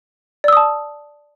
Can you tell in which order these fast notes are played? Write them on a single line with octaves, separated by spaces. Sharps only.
D5 E6 D#6 A5